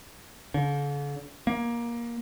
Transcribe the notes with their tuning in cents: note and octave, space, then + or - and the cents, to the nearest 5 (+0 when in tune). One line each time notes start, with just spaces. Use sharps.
D3 -45
A#3 +15